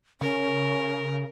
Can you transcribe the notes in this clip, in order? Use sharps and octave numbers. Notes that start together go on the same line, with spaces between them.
C#3 C#4 A#4